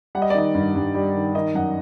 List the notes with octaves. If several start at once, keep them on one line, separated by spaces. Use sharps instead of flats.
G3 F#5
D#5
D5
D#3 D#5
G2
G2
G3
D#3
D#3 D#5
F#2 F#5